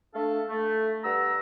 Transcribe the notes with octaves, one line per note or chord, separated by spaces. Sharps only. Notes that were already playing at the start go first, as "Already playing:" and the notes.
A3 D4 A4 F5
A3
G2 F#5 A#5 E6